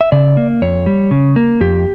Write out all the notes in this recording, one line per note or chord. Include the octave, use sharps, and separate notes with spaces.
E5
C#3 D5
A#3
F2 C#5
G3
C#3
A#3
F2 G4